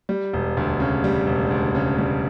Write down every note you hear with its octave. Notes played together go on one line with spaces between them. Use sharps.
G3
E1
D2
C#3
G3
E1
D2
C#3
G3